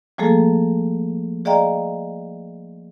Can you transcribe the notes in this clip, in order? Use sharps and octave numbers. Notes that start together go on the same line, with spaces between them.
F3 G3 A3 A#3 G#4 A4
G#4 D5 D#5 F5 G5 A#5